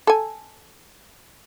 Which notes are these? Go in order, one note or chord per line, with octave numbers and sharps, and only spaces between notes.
A4 G#5